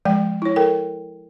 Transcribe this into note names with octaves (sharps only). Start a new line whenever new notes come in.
F3 G#3 D5 G5
E4 C#5
A4 A#4 G5